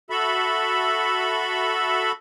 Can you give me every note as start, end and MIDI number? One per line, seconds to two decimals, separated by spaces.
0.10 2.12 66
0.10 2.12 69
0.10 2.12 76
0.10 2.12 83